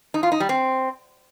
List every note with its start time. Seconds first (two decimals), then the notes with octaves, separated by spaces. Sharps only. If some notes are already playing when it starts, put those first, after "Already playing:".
0.14 D#4
0.23 F4
0.32 D#4
0.40 G3
0.49 C4